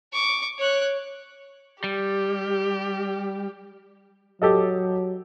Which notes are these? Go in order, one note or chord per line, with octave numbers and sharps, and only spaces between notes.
C#6 D6
C#5 F#6
G3 G4
F#3 G4 A4 D#5